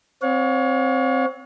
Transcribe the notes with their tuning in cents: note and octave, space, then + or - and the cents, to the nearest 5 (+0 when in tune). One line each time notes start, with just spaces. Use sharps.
C4 +0 C#5 +20 F5 +45